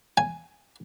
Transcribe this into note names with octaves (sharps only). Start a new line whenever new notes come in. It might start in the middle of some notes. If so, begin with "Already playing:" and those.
G#5